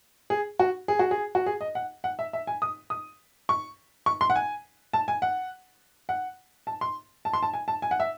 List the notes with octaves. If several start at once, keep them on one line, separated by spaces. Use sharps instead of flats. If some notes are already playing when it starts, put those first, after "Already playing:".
G#4
F#4
G#4
F#4
G#4
F#4
G#4
D#5
F#5
F#5
E5
E5
G#5
D#6
D#6
C#6
C#6
C6
F#5
G#5
A5
G#5
F#5
F#5
A5
C6
A5
C6
A5
G#5
A5
G#5
F#5
E5